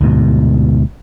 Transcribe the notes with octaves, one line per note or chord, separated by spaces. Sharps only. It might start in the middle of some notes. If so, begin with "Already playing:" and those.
D2 G#2 B2